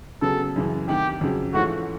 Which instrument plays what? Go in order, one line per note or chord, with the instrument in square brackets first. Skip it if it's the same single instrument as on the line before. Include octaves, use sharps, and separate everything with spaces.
[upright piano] C#3 F#3 B3 [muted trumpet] A4
[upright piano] F#2 C#3 E3
[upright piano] D2 C3 D#3 [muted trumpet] G4
[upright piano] F2 C#3 F#3
[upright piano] G#2 E3 A3 C#4 F4 [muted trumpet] F#4